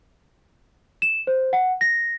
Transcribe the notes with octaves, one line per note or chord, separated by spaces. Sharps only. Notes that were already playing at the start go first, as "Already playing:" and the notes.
E7
C5
F#5
A#6